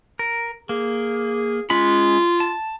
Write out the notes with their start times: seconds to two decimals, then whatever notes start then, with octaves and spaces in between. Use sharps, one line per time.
0.19 A#4
0.69 A#3 G#4
1.70 G#3 C#4 F4 B5
2.40 A5